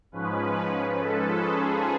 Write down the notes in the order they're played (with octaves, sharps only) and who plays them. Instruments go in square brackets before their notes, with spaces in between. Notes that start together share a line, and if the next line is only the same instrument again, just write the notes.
[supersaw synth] G#2 F3 G#3 C#4 B4
A4
G#4